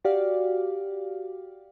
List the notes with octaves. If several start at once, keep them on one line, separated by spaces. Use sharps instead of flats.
F#4 G4 D5 F5